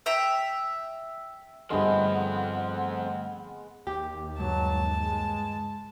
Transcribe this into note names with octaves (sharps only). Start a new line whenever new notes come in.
E5 G5 A#5
G2 D3 F3 G#3 A3 B3 C4 F#5
D#2 G4
C#2 G2 F#3 A5
G#3